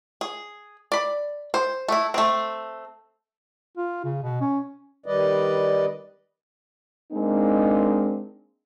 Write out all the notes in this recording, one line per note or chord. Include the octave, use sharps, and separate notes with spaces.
G#4
D5 B5
C5
A3 E4
A3 C4
F4
C#3
B2
C#4
D#3 G3 B4 D5 D#5
G#3 A#3 C4 D4 D#4